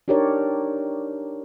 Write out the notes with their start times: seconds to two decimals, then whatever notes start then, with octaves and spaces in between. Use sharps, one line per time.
0.08 D4 D#4 G4 A#4 C#5 D5